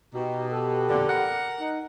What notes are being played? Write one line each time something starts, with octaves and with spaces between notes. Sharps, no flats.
B2 D#4 G4
G4 A4 B4
F2 A#2 D3
A#4 F#5
D#4